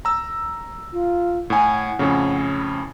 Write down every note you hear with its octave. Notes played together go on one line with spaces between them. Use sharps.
A#5 E6
F4
A2 F#5 G#5
F2 A2 C#3